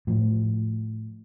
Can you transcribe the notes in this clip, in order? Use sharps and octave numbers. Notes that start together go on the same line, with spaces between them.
A2 F3